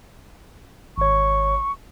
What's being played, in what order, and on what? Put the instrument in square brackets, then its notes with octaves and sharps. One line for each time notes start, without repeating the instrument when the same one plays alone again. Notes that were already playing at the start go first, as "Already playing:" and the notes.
[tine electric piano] G#1 C#5 [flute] C#6